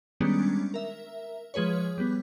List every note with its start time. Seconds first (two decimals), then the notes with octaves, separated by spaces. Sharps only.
0.20 D#3 G3 G#3 B3 C#4 D4
0.74 A#4 E5
1.54 F3 G#3 G#4 B4 C#5
1.98 G3 B3